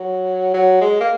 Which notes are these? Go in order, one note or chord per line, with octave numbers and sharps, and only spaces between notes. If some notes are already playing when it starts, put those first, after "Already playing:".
Already playing: F#3
F#3
G#3
A#3